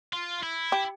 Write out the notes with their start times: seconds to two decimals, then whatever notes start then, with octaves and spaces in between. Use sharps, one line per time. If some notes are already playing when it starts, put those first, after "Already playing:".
0.13 F4
0.43 E4
0.72 G4